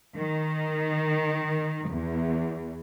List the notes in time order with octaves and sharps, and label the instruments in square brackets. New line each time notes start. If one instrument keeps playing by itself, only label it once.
[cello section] D#3
E2